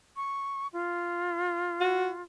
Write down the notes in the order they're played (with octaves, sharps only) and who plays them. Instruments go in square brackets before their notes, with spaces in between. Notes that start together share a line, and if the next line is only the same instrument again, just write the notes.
[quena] C#6
F4
[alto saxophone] F#4